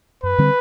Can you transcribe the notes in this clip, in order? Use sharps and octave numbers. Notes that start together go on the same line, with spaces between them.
F#2 B4
D3 G3 C4